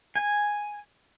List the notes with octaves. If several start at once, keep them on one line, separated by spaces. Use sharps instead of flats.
G#5